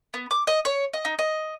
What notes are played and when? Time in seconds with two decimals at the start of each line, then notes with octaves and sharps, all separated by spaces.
0.14 B3
0.31 D6
0.47 D#5
0.65 C#5
0.93 D#5
1.05 D#4
1.19 D#5